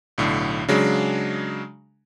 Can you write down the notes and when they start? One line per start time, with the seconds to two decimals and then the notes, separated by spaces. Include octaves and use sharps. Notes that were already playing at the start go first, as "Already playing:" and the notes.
0.18 B1 A2 D3
0.68 C#3 F#3 G#3 D4